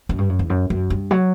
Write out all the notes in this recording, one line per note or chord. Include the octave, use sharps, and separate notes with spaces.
F#2
G2
F#2
E2
F#2
F#2
G2
F#3